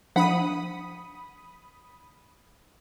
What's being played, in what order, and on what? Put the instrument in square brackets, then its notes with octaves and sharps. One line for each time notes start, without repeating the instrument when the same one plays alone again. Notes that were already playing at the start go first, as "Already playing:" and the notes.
[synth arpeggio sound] F3 D4 [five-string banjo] F#5 [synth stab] B5 D#6